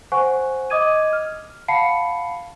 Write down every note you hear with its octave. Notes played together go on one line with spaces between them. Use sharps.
C5 F#5 G#5 C#6 F#6
D#5 D6 D#6 G#6 D#7
F6
F5 F#5 A5 B5 C7 C#7